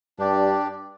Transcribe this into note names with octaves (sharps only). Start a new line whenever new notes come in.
G2 D4 G4 D5